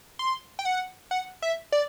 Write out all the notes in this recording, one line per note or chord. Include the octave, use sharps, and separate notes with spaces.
C6
G5
F#5
F#5
E5
D5